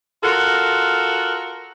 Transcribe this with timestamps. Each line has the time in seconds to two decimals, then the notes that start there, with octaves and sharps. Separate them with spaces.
0.22 F4 F#4 A4 A#4